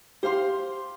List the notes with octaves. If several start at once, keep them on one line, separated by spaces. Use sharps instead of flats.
G4 C5 F5 C6